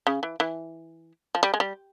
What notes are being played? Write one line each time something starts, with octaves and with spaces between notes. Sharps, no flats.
C#3
E3
E3
F3
G3
G#3
G3